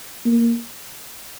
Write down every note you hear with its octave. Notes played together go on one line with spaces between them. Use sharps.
A#3